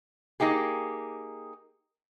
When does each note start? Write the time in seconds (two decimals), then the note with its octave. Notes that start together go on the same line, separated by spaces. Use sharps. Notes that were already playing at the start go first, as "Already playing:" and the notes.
0.40 A#3 D#4 G4 G#4